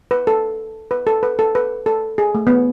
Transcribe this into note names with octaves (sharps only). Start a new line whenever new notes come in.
B4
A4
B4
A4
B4
A4
B4
A4
G#4
A3
B3